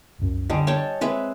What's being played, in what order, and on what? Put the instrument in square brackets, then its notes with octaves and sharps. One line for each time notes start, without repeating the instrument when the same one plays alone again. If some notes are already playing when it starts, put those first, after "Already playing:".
[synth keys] C2 F#2
[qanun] D3 G3 [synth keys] D#5 G#5 C#6
[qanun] C#5 G5 A5
[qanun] G#3 B4 E5 [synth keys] C4